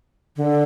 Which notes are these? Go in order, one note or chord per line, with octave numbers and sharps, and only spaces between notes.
D3